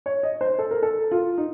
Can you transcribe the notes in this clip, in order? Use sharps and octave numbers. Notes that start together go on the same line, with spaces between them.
C#5
D#5
C5
A4
A#4
A4
F4
D#4